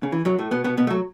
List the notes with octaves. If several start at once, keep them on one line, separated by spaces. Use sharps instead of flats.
C#3
E3
F#2 F#3
A2 A3
B2 B3
B2 B3
B2 B3
A3
F#3